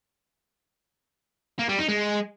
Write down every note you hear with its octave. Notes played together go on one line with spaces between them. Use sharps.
A#3
G3
D#4
G#3